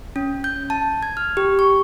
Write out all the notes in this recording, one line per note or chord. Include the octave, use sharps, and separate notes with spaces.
C#4
G6
A5
G#6
F6
G4
C#6